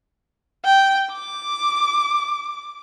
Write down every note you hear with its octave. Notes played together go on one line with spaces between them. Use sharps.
G5
D6